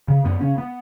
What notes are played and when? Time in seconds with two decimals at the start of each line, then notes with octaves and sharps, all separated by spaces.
0.08 C#3
0.25 F#2 B3
0.41 C#3 C#4
0.58 B3